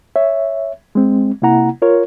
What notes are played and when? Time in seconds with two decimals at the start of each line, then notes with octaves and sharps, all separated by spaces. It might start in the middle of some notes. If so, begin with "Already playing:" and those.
0.16 C#5 E5
0.95 G#3 C4
1.42 C3 A#3 E4 F#5 A#5
1.82 F4 A#4 C#5